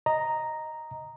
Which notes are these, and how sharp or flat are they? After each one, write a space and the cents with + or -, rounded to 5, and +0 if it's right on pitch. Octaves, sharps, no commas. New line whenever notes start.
D#5 +0 A#5 +0